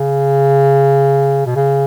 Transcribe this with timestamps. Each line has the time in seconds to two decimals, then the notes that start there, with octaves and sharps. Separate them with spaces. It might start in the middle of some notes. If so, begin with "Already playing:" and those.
Already playing: C#3
1.46 B2
1.56 C#3